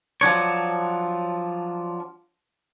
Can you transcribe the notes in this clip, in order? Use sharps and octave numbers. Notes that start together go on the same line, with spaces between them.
F3 F#3 D4 C#5